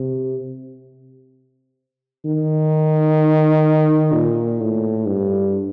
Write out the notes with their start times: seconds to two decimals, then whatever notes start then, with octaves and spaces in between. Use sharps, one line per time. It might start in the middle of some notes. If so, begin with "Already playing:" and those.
Already playing: C3
2.25 D#3
4.13 A#2
4.61 A2
5.07 G2